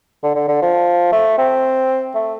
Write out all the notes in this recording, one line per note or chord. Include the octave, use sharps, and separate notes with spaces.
D3
D3
D3
F3
A3
C4
A3